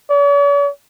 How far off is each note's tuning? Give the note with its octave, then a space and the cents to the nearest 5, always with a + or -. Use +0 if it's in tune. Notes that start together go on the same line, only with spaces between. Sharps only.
C#5 +45